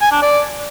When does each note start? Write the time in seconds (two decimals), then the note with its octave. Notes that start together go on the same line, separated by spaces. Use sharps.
0.01 G#5
0.12 D4
0.22 D5